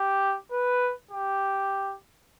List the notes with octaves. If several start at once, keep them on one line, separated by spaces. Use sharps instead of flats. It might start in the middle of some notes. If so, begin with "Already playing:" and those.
Already playing: G4
B4
G4